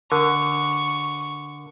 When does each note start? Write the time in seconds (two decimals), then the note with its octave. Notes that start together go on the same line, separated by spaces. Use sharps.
0.12 D3 A#4 C#6